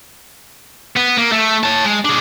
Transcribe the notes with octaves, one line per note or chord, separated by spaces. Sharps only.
B3
A#3
A3
C#5 A5
G#3
D4 G#4